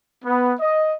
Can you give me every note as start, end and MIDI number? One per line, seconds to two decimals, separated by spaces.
0.24 0.54 59
0.60 0.95 75